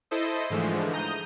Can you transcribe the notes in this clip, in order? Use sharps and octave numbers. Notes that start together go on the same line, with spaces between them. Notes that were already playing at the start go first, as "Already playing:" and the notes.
E4 A4 C5 D#5
G#2 D3 E3 F3 G#3 A3
A#5 D#6 G6